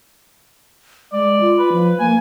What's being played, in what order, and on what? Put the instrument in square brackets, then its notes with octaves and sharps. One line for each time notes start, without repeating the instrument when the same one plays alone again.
[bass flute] G#3 [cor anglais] D5
[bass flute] F4
[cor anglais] B4
[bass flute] F3
[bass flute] A#3 [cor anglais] G#5